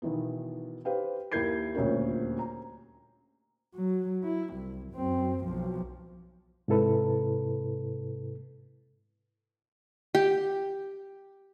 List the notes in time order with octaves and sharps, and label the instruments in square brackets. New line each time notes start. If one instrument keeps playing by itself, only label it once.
[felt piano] B1 D#3 E3 B3
G4 B4 C5 F5 G5
D#2 E4 A#4 G6 G#6 C7
D#1 D2 A#2 C#4 A#4 C#5
A#5
[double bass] F#3
E4
C2
F#2 C4
B1 F3
[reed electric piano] G#2 C3 E4 A4 B4
[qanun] G4